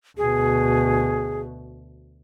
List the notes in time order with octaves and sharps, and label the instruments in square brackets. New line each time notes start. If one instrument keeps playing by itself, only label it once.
[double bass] D2 B2 [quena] G#4